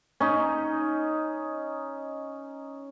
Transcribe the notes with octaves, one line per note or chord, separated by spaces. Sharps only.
C#4 D#4